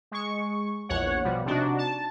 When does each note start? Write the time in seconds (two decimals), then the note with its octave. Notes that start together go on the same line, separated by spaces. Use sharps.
0.11 G#3 C#6
0.89 A#1 E2 C#5 F#5
1.24 B2 F3 G3
1.45 C3 D4 D#4 F#4
1.78 A5